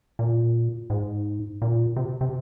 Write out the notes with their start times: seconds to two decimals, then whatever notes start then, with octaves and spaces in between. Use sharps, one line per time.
0.19 A#2
0.90 G#2
1.62 A#2
1.96 C3
2.21 C3